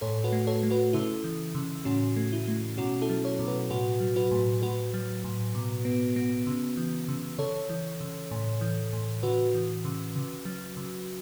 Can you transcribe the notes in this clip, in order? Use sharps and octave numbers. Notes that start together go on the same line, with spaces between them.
A2 A4 C#5
F#4 B4
A3
A4 C#5
A3
F#4 B4
C#3 E4 A4
E3
C#3
A2 C#4 F#4
A3
E4
A3
B2 C#4 F#4
E4 A4
F#3
A4 C#5
B2
F#4 B4
A2 F#4 B4
F#3
F#4 B4
A2
A2 F#4 B4
F#3
A2
B2
B3
B3
C#3
E3
C#3
C#3 A4 C#5
E3
C#3
A2
E3
A2
C#3 F#4 B4
E3
C#3
C#3
F#3
C#3